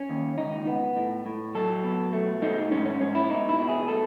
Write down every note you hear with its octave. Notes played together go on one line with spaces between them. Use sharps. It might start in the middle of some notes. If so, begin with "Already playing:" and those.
Already playing: C#4
D#2
C#2 D#4
B3
A2
A2
F#3 A4
B2
A3
A3 D#4
G#2 C#4
C#4
G#2 C#4
E4
B2 D#4
E4
B2
G#4
A3 A4